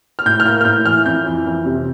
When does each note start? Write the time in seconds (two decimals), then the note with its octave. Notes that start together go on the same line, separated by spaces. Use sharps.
0.19 F6
0.26 A2 G6
0.40 F6
0.45 A#3 G6
0.61 F6
0.65 A2 G6
0.85 E3 F6
1.06 F2 G6
1.25 E3
1.46 F2
1.65 C3